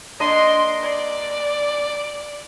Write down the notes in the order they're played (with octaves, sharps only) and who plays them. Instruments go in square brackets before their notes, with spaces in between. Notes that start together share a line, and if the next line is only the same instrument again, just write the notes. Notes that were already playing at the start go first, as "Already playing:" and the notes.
[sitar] A#3 D4 D#5 [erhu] C6
[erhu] D5